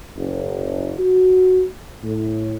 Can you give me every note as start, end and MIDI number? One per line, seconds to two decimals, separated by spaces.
0.16 0.94 30
0.99 1.63 66
2.04 2.54 45